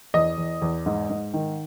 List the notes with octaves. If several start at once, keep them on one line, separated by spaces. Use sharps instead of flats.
E2 D#5
E2
E2
G#2
G#2
D#3